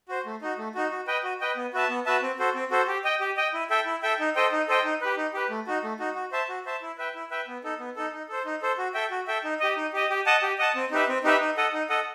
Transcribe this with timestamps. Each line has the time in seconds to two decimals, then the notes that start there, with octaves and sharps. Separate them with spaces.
0.09 F#4 C5
0.26 A3
0.42 D#4 F#4
0.58 A3
0.75 D#4 F#4
0.91 F#4
1.07 B4 D#5 G5
1.23 F#4
1.41 B4 D#5 G5
1.56 B3
1.74 F#4 B4 E5 A5
1.90 B3
2.06 F#4 B4 E5 A5
2.22 C4
2.39 F#4 A4 C5
2.54 C4
2.71 F#4 A4 C5
2.88 G4
3.04 D#5 G5
3.20 G4
3.37 D#5 G5
3.54 E4
3.70 A4 E5 G5
3.86 E4
4.03 A4 E5 G5
4.20 D#4
4.35 A4 C5 D#5 G5
4.52 D#4
4.68 A4 C5 D#5 G5
4.85 D#4
5.01 G4 B4
5.17 D#4
5.34 G4 B4
5.50 A3
5.67 D#4 F#4
5.83 A3
5.99 D#4 F#4
6.15 F#4
6.32 C5 E5 A5
6.49 F#4
6.66 C5 E5 A5
6.82 E4
6.98 B4 E5 G5
7.15 E4
7.31 B4 E5 G5
7.48 B3
7.64 D#4 A4
7.79 B3
7.96 D#4 A4
8.13 D#4
8.29 A4 C5
8.45 D#4
8.62 A4 C5
8.78 F#4
8.94 A4 E5 G5
9.10 F#4
9.27 A4 E5 G5
9.44 D#4
9.60 G4 D#5
9.77 D#4
9.93 G4 D#5
10.10 G4
10.26 D#5 F#5 A5
10.43 G4
10.58 D#5 F#5 A5
10.75 C4
10.91 D#4 G4 B4 E5
11.08 C4
11.24 D#4 G4 B4 E5
11.40 D#4
11.57 A4 D#5 F#5
11.73 D#4
11.89 A4 D#5 F#5